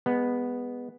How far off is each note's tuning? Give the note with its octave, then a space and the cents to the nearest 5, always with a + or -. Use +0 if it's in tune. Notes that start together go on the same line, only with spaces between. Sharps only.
G#3 -30 B3 +0